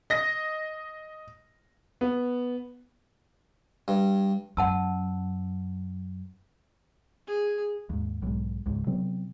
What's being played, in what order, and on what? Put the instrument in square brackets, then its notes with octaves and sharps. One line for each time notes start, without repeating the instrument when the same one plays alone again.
[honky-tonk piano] D#5 A#6
[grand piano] B3
[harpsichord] G2
[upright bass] F#2 [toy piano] F#5 A5 E6
[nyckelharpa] G#4
[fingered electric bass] D#2 G#2
B1 G#2
C#2 G#2 C#3
C3 F#3 B3 C4